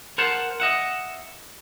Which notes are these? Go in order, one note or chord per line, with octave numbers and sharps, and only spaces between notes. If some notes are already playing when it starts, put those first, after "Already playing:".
A#4 C5 F#5 A5
D#5 E5 F#5